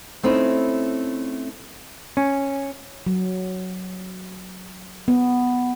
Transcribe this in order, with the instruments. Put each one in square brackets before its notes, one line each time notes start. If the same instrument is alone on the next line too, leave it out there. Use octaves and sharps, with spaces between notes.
[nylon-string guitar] A3 C4 C#4 D#4 E4
[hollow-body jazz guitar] C#4
[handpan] F#3
B3